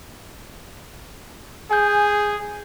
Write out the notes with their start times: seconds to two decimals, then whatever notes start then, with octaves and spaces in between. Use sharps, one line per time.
1.71 G#4 G#5 G6